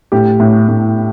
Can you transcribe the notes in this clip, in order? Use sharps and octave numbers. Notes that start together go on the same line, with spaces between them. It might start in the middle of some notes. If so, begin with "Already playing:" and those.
A2 G4
A2
A2